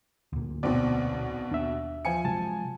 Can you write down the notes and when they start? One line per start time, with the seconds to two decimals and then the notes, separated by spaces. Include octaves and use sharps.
0.33 D2 A#2
0.63 B1 B2 C4 D5
1.51 D#2 D4 E5
2.05 F3 G#5 C#7
2.25 C3 F#3 G#3 A5